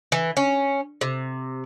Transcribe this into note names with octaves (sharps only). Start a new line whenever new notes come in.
E3
C#4
C3